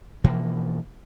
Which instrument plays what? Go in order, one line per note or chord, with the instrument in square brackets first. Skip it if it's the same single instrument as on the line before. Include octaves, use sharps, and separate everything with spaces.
[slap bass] B2 E3 F3 A#3